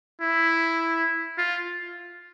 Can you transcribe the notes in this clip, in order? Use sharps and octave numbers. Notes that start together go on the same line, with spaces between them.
E4
F4